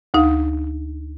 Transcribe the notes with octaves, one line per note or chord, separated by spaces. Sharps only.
D2 D#4 F5